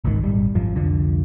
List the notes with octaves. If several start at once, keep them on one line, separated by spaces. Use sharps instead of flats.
G#1 C#2 G#2 D#3
D#1 G#1 G3
G#1 F#2 F3
C2 F2 D3 F3